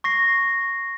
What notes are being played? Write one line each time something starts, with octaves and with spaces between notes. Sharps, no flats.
C#6 A#6 C7